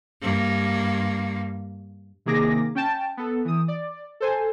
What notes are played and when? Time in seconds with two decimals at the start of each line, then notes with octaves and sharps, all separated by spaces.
0.22 G2 A#3
2.26 C3 D#3 A#3 G#4 D6 A#6
2.75 C#4 G5 A5
3.17 B3 A4
3.45 E3 D#6
3.68 D5
4.20 A4 C5 G#5